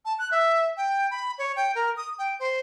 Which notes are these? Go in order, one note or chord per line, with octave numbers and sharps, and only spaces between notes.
A5
F#6
E5
G5
B5
C#5
G5
A#4
D#6
G5
C5